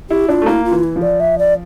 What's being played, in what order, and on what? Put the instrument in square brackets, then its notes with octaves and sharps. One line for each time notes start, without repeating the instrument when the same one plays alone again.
[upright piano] E4 [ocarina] G4
[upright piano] D4 [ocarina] F4
[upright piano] A3
[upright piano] A#3 [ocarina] E4
[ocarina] F4
[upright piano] E3
[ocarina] E4
[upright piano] F3
[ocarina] D5
E5
D5